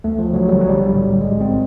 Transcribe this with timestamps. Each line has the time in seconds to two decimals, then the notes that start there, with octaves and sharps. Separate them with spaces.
0.04 D2 A3
0.19 F3
0.34 D3 F#3
0.49 G3
0.59 B1 F#3
0.69 G3
0.92 A2
1.21 A1 G#3
1.41 C4
1.50 A2